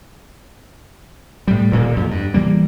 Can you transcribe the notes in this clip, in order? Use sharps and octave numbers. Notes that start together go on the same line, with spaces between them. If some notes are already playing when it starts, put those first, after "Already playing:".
A2 G3
D#1 A#2 A#3
F2
G2
E3 G3 A#3